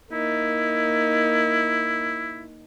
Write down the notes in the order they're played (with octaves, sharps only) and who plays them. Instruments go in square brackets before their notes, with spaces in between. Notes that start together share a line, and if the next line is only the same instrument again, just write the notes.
[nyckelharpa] A#3 D#4 [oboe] E4